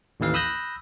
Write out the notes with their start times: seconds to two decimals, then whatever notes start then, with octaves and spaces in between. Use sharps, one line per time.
0.20 A1 D#2 E3 F5
0.34 B5 D#6 E6 F#6 G6 A#6